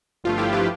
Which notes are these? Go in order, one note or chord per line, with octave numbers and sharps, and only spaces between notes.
G1 G2 F3 A3 F4
E4 G4
G4 B4